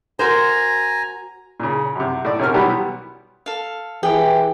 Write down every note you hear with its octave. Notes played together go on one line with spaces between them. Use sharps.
F#4 A#4 C5 G#5 A#5
A#2 C#3
F#2 C3
A2 D5
B1 C3 C#4 A#4 F6
B1 E3 F#3 G3 B3 G4
A4 F5
E3 G4 G#4 F#5 G5